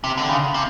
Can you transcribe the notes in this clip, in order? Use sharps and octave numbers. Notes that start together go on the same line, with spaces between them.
C3
D3
C#3
C3